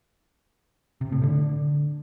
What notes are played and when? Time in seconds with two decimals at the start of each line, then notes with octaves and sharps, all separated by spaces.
1.01 C3
1.12 A2
1.23 D3